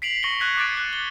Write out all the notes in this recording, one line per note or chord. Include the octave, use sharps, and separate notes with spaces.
B6 C7 D7 F7 F#7
C#6 A#6 C#7 G7
C#6 F#6 G#6 B6
D6 F#6 A6 C#7 D7
F#6
G7